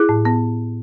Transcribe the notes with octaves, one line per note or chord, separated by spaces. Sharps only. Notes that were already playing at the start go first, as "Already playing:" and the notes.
Already playing: E4 G#4
A2
B3